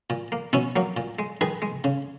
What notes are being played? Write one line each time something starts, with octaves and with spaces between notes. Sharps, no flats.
A#2
A#3
B2 C#4 E4
F#3 A#3
A#2
G#3
D#3 G#4 B4
G#3
C#3